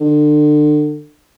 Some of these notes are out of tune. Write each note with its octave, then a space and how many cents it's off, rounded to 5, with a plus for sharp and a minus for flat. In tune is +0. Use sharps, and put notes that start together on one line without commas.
D3 +30